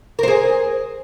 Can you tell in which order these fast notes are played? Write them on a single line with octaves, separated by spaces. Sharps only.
A#4 C5 G#4